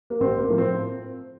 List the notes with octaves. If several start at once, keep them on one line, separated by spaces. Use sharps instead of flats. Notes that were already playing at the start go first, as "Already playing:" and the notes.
A#3
A1 C4
A#3
A2 F3
C4